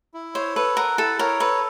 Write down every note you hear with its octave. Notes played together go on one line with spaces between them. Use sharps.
E4
C5 C#5
A4 B4
A#4 F#5
E4 A4
A#4 C#5
A4 B4